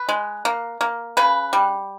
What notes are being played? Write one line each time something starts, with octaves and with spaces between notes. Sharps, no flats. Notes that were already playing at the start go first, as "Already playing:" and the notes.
Already playing: B4
G#3
A#3
A#3
C#3 B4
G3